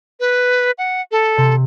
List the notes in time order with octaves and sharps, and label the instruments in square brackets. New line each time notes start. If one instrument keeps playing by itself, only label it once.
[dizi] B4
F#5
A4
[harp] C3